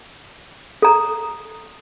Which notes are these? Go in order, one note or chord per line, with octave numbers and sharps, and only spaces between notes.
A4 A#5